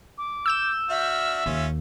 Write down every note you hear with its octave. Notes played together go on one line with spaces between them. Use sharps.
D6
E6 G6 E7
D4 F#4 E5 F6
D#2 C#4 F4